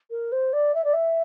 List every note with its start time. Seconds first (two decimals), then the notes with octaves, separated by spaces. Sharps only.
0.11 A#4
0.32 C5
0.53 D5
0.75 E5
0.84 D5
0.93 E5